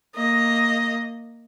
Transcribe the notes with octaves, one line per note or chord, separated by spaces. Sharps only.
A#3 D#5